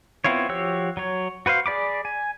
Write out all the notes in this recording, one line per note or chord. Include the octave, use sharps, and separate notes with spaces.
B3 C4 E4 F4 C#5
F3 F#4 G4 C#5 E6
F#3 C#5
F#4 B4 C5 F5
G#4 D5 B5 D6
G#5